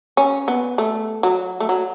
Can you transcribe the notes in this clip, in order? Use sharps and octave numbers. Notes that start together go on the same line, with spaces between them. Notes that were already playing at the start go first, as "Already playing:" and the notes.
C#4
B3
A3
F#3
A3
F#3